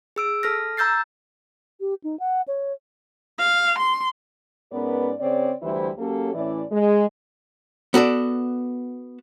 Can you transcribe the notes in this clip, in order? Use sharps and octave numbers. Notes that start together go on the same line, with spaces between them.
G#4 E6 D7
A4 F6 A#6
A#5 E6 G6 A6 C7
G4
D#4
F#5
C#5
F5
C6
G#2 B3 C#4 A#4 B4 D5
C#3 C4 C#5 D5
D2 E3 G3 E4 C5
F#3 A#3 C#4 G4 A4
A2 E3 C#4 E4 D5
G#3
B3 F#4 A4 D5